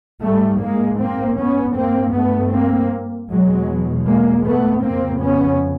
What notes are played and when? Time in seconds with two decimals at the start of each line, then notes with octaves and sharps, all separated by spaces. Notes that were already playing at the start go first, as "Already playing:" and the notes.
0.23 G#2 G3 A3
0.62 G#3 A#3
1.00 A#3 C4
1.38 B3 C#4
1.76 G2 A#3 C4
2.15 A3 B3
2.53 A#3 C4
3.30 E2 B2 F#3 G#3
4.06 G#3 A#3
4.45 A3 B3
4.83 F2 C#3 A#3 C4
5.22 B3 C#4